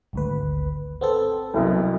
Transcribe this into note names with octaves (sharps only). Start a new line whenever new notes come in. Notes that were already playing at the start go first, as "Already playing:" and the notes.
G#1 D2 B4
B3 C4 A4
C2 F#2 B2